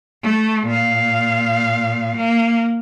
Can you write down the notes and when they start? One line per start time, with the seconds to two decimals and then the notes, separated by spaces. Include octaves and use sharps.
0.23 A3
0.66 A#2 F5
2.17 A#3